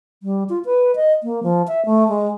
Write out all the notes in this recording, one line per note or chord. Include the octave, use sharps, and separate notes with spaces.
G3
F4
B4
D#5
A#3
F3
E5
A3
G#3